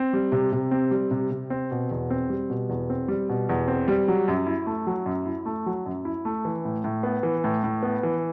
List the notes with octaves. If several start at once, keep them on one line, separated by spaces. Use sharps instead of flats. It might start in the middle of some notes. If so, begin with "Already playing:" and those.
Already playing: C4
G3
C3
C3
C4
G3
C3
C3
C4
B2
E2
C4
G3
B2
E2
C4
G3
B2
E2
C4
G3
F#3
F#2
E4
A3
F#3
F#2
E4
A3
F#3
F#2
E4
A3
E3
A2
A2
B3
E3
A2
A2
B3
E3